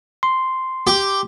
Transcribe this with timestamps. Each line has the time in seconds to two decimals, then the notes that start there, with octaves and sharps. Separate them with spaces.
0.23 C6
0.87 G4